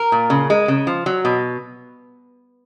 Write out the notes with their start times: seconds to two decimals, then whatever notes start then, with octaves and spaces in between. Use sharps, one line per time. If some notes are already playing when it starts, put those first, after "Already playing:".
Already playing: A#4
0.12 A#2
0.30 C#3
0.50 G#3
0.68 C#3
0.87 F3
1.06 F#3
1.25 B2